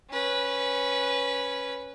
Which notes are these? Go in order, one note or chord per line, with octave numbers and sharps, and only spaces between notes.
C#4 B4